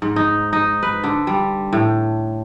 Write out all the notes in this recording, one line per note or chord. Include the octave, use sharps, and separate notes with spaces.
G#2
D#4
D#4
B4
D3
G3
A2